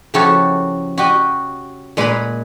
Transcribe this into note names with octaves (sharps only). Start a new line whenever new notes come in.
C#3 F3 E4 F#4 G4 A4
F#4 G4 D#5
A#2 G#3 A#4 B4 A#5 B5